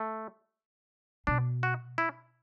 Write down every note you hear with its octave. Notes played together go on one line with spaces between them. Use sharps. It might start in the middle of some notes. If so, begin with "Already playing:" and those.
Already playing: A3
B2 D4
F#4
E4